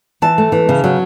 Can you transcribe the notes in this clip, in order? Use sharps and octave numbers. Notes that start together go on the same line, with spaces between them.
E3 A5
A3
E3
C#3
F#3